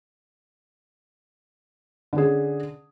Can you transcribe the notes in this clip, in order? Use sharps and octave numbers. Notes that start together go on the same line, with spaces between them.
D3 C#4 G#4